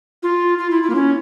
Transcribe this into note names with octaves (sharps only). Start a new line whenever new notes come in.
F4
F4
E4
E4
A#3
C#4